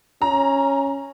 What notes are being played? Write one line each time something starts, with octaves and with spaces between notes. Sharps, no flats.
C#4 A#5